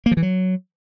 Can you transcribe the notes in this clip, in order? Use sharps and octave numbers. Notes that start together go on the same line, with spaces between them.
A#3
F3
E3
F#3